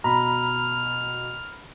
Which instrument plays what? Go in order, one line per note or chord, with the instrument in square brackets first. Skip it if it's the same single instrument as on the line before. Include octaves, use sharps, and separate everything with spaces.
[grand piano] B2 [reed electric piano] A#5 B5 [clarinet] F6